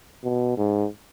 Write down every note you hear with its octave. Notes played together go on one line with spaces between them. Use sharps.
B2
G#2